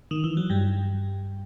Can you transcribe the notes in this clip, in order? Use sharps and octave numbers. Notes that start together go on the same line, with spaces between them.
D#3
E3
F#3
G2 G3